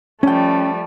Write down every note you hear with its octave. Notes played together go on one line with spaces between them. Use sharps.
F3 G3 A3 C#4 G5